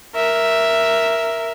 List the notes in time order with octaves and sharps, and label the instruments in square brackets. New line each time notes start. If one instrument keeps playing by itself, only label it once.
[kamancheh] A#4 E5